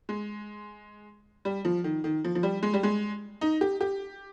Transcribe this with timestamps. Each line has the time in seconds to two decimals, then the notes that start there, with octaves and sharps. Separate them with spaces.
0.09 G#3
1.45 G3
1.65 F3
1.84 D#3
2.04 D#3
2.25 F3
2.35 F3
2.43 G3
2.63 G#3
2.74 G3
2.83 G#3
3.41 D#4
3.61 G4
3.81 G4